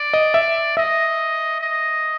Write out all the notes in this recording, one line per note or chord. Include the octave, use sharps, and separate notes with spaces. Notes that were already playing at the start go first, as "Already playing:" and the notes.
Already playing: D5
D#5
E5
D#5 E5
D#5